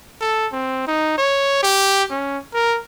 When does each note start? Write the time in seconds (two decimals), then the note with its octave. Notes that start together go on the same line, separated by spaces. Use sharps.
0.21 A4
0.52 C4
0.87 D#4
1.18 C#5
1.63 G4
2.10 C#4
2.54 A#4